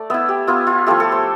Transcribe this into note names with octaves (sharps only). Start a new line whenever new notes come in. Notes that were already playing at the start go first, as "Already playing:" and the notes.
Already playing: A3 D5
B3 E4 E5
G4
B3 E4 F4
F4
F3 A3 E4 G4
A4
C5